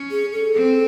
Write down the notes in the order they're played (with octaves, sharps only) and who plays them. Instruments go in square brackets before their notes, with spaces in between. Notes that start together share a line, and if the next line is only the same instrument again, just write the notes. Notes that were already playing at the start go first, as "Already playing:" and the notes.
Already playing: [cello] C#4
[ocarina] G#4
A4
[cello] C4